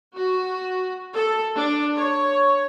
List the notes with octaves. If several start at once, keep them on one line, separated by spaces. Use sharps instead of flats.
F#4
A4
D4
C#5